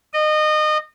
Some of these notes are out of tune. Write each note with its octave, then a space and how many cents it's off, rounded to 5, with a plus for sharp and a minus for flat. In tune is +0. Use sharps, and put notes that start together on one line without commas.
D#5 -25